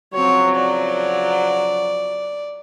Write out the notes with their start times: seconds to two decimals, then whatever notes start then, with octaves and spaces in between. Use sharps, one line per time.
0.14 C#3 F3 F#3 C4 C#5
0.55 D5